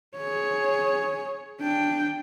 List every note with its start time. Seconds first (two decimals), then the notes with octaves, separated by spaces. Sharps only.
0.17 G#4 C#5
1.60 D4 G5